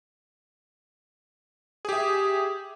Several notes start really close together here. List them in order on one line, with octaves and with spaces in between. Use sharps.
G#4 G4 E5